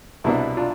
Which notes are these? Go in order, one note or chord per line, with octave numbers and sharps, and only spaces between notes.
C2 B2 B3 D4 E4
D4 F4